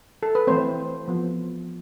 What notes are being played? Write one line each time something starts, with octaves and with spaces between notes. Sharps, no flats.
A4
B4
E3 A3 C4 C5
F3 B3